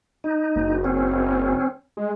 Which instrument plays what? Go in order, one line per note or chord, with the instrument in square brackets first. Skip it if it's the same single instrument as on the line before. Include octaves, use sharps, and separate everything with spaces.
[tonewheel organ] D#4
[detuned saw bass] F#1
[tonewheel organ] C4 C#4
[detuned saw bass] G#3